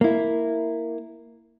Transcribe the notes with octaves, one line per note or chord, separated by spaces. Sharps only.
A#3 E4